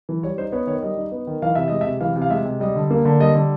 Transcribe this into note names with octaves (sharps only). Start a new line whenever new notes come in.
E3
G3 C#5
D#4 C5
B3 C#5
D#3 C#5
G3 D#5
D#4
B3
D#3
E3 F5
C3 E5
G#3 D#5
E5
C3
E3 F5
C3
F5
G#3 E5
C3
G3 D#5
D3
A#3
D3
G3 D#5
D3